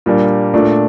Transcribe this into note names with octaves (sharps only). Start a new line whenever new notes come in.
A#2 G3 A#3 D4
A#2 A3 D4